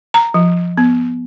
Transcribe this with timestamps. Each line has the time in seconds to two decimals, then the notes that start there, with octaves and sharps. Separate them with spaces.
0.14 A#5
0.34 F3
0.78 B3